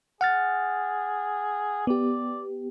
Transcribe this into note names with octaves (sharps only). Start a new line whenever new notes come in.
G#4 F#5 F6 A6
B3 G4 D5